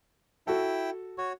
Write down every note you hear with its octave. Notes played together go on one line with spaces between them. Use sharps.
E4 F#4 A4 G5
F#4 C#5